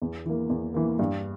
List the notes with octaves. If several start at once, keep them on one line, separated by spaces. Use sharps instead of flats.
E2
E3 A#3
E2
E3 A#3
G2